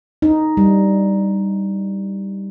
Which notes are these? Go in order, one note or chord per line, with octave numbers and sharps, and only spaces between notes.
D#4
G3